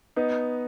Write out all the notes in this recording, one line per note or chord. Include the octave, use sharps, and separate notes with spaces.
B3 D#4